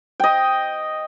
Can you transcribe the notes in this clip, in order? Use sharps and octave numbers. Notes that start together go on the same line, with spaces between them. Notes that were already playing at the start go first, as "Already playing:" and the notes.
D#5 G5